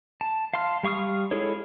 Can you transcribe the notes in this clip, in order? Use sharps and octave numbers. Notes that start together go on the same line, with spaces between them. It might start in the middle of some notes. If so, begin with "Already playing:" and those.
A5
F5 A5 C6 F6
G3 F5 C#6 D#6 F6
G#3 E4 G#4 A4 C#5